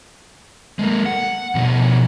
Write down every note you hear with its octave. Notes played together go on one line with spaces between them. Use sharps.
G#3 A#3
F#5
B2 F3